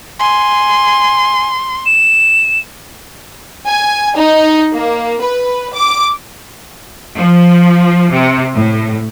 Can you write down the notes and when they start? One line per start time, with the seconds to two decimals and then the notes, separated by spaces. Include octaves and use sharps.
0.20 G#5 C6
1.86 E7
3.67 G#5
4.16 D#4
4.73 A#3
5.23 B4
5.75 D6
7.15 F3
8.12 C3
8.54 A2